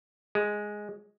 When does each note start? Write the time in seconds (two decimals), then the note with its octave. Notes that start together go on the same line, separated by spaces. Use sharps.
0.35 G#3